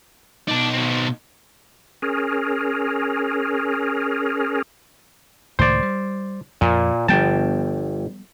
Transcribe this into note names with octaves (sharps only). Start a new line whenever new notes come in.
B2 D#4 D5 A5
C4 F#4
C#4 G#4 A#4
C#2 A2 D#3 C5 D5
G3
F2 A#2
G1 F3 G3 B3 G5 A5